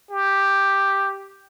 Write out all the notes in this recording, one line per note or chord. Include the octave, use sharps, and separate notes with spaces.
G4